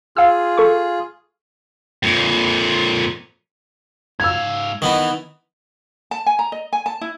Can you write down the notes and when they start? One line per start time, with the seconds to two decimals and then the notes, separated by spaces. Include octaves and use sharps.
0.17 F4 G#4 F5 E6
0.57 A4 C#6
2.03 F2 A#2
4.20 G#2 F5 E6 G#6
4.82 D#3 E3 B3 D#4
6.11 A5
6.26 G#5
6.39 A#5
6.52 D#5
6.73 G#5
6.86 A5
7.01 E4